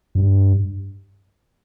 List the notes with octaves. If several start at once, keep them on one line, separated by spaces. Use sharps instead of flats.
G2